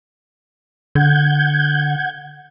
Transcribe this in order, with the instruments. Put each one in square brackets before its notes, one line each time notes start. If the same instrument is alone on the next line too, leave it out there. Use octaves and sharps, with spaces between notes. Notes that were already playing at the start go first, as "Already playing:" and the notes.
[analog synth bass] D3 [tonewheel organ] F#5 G6 G#6